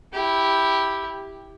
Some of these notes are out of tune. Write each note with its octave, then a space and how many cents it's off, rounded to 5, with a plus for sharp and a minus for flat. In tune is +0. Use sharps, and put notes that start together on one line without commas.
E4 -10 G4 +0